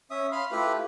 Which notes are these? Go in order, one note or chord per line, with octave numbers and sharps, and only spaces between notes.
C#4 E5 D#6
F5 B5 C6
A3 E4 F4 G4 B4